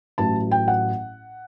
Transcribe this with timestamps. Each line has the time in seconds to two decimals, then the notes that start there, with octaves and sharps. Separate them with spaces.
0.18 A1 A2 F#3 A5
0.51 G5
0.68 F#5